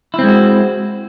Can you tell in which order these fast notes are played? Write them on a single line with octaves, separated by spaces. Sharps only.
E4 C4 G#3 F#4